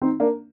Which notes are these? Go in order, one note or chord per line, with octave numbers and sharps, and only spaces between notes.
C4 D#4
A#3 D4